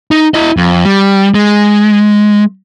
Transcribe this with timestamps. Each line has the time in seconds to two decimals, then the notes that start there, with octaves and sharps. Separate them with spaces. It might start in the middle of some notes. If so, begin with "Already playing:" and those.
0.11 D#4
0.34 E4 D#5
0.57 F2
0.85 G3
1.35 G#3